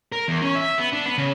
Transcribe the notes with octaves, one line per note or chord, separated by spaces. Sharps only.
A#4
E2
C#4
E5
B3
D4
B3
C#3